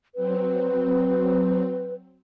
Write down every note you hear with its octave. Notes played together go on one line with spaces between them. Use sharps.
F#3 C4 B4